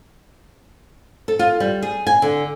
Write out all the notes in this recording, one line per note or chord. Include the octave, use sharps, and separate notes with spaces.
A4
F4
G3
G#4
G#5
D3